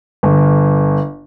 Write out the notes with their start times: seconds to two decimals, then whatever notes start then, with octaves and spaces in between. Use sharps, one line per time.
0.23 G1